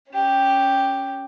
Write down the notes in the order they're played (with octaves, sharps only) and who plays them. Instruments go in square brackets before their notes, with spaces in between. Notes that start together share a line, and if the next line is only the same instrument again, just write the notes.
[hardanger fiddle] C#4 G4